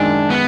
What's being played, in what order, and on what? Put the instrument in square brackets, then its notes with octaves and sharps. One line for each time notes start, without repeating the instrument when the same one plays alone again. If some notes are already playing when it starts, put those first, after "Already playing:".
Already playing: [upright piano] F#2 D#3 G#3 [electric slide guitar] D4
[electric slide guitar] B3